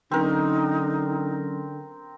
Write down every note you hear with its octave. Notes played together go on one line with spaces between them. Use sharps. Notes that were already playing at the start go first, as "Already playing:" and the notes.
D3 F#3 C4 C#4 D#4 A#4